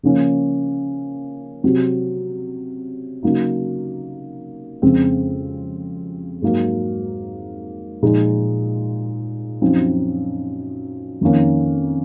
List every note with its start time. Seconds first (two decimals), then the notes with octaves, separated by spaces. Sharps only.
0.03 C#3 F3 A#3 C#4
1.63 C3 F#3 C4
3.23 C#3 F#3 A#3 D#4
4.82 F2 C#3 G#3 C4
6.42 G#2 F#3 A#3
8.02 A#2 F3 G#3 D#4
9.61 F#2 F3 C4 D#4
11.21 F2 D#3 A#3 C#4